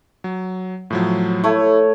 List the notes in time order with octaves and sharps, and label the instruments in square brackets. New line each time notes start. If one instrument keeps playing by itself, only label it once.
[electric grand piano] F#3
A2 F3 F#3
[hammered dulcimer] A3 C#5 [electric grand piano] E4